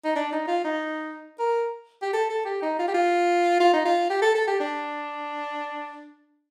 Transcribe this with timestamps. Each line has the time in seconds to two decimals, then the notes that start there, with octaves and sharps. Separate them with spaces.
0.05 D#4
0.15 D4
0.32 D#4
0.48 F4
0.64 D#4
1.39 A#4
2.02 G4
2.13 A4
2.30 A4
2.45 G4
2.62 D#4
2.79 F4
2.88 G4
2.94 F4
3.60 F4
3.73 D#4
3.85 F4
4.10 G4
4.22 A4
4.35 A4
4.48 G4
4.60 D4